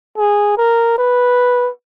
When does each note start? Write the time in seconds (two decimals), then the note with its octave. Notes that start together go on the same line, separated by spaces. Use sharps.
0.18 G#4
0.58 A#4
0.98 B4